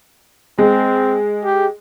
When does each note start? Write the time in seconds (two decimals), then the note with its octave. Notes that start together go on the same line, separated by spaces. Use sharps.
0.58 G#3 C4
1.44 G4